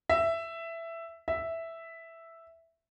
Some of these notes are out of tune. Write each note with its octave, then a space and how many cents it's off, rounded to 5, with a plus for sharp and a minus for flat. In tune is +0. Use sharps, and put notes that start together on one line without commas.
E5 +10
E5 +0